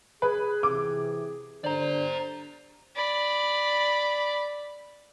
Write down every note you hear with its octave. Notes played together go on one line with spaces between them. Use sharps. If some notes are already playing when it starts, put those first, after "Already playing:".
G#4 B4
C3 E3 D6
D3 G3 D4 C5 D5 A#5
D5 B5